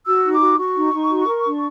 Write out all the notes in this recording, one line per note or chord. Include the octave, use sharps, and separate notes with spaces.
F#4 E6
D#4
D6
F#4
F#4 C#6
D#4
D#4
F#4
A#4
D4